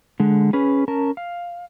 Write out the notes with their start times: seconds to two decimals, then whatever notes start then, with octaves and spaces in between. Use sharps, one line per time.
0.20 D3 G#3
0.53 C#4 G#4 B4
0.88 C#4 A#4 A5
1.17 F5